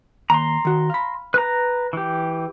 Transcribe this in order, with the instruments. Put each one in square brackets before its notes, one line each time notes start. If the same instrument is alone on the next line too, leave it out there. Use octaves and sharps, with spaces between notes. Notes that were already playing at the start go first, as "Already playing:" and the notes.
[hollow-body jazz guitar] D#2 [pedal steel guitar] A#5 C6
[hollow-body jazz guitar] D#3 F#4
F5 B5
[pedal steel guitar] B4 A#5
E3 G4